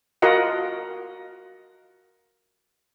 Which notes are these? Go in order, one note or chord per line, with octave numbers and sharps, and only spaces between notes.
F4 F#4 A#4 D#5 F#5